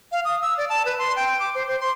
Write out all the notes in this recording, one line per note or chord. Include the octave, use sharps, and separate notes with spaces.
F5
D#6
E6
D5
A5
B4
C6
G5
D6
C5
C5
C6